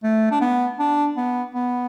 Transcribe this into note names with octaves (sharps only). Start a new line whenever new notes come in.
A3
D4
B3
D4
B3
B3